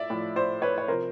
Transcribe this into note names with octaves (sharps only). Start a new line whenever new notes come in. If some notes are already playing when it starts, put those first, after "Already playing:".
Already playing: A2 D5 E5
A2 F3
C5 D5
B4 C#5
C#5
C3 F3 A#4 C5